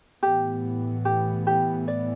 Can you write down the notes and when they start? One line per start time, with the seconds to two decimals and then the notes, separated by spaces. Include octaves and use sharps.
0.23 A2 E3 B3 G4
1.05 G4
1.47 G4
1.88 D5